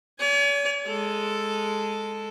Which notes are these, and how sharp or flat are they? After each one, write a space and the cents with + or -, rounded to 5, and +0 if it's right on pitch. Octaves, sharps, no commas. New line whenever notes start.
C#5 +45 G#5 +0
G#3 +0 A4 +0